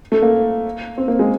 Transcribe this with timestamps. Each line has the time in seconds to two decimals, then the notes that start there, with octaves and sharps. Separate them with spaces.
0.12 A3
0.22 A#3
0.98 C4
1.08 A#3
1.19 G#3